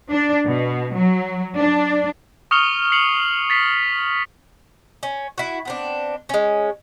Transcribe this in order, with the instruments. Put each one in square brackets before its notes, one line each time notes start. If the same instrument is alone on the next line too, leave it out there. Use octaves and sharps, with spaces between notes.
[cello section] D4
B2
F#3
D4
[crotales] C#6 D#6 F6 C#7 F7 G7
C7 C#7 F7 F#7
A6 B6 C7
[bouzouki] C#4
E4 F#4
B3 C4 D4
G#3 C#4